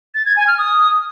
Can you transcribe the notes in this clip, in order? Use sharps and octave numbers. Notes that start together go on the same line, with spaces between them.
A6
G#6
G#5
F6
D#6